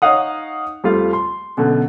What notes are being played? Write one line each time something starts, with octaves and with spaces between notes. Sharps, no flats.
D#4 C#5 D#5 F5 F#5 D#6
F2 G3 A3 F4 F5
C6
F#2 B2 D3